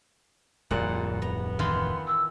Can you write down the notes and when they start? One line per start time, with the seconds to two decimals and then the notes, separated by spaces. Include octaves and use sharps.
0.71 D1 F2 A#2 G3 F#5
1.22 B3 A#5
1.59 D#3 E3 F4 C6
2.07 E6